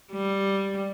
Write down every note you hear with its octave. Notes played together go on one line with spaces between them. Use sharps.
G3